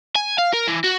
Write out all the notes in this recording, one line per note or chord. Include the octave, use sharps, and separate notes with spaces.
G#5
F5
A#4
E3
F#4